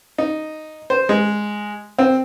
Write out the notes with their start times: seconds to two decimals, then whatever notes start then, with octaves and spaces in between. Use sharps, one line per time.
0.18 D#4
0.90 C5
1.09 G#3
1.99 C4